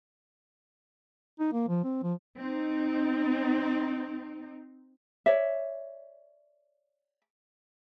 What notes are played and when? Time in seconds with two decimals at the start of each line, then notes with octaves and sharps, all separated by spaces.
1.39 D#4
1.53 A#3
1.68 F3
1.83 C4
2.03 F3
2.39 C4 D#4
5.26 C#5 D5 E5